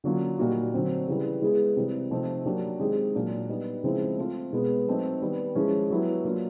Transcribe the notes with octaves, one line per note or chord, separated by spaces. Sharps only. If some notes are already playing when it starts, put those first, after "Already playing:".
D3 F#3 A#3 C#4 F4
A#2 G3 A#3 D#4 F#4
D3 F#3 A3 C4
C#3 E3 G3
G#3 B3 E4 G#4
C3 E3 G3
C3 F3 A3 C4 D#4
F#3 A#3 D4 G4 A#4
D#3 G#3 C4 D#4 G4
A#2 F#3 A#3 D4
G3 B3 D#4
C#3 F3 G#3 C4 E4
A3 C4 F4
B2 G#3 B3
F#3 A3 C4 D#4
D#3 G3 B3
F3 G#3 C#4 E4
F#3 B3 E4 G4
F#3 A#3 D4 F4